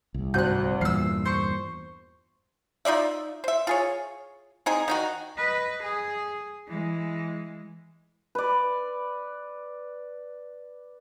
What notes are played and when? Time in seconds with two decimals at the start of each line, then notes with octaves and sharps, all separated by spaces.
0.14 C2
0.34 G#1 D2 F#6 G6
0.81 E2 G2 A#2 E6 F6 C7
1.26 C5 C#6
2.85 D#4 F4 D5 E5
3.44 C5 E5
3.67 F4 G#4 C#5
4.66 C4 D#4 G#4
4.88 D#3 D#4 F#4
5.37 B4 D#5
5.83 G#4
6.68 E3 G#3
8.35 B4 D5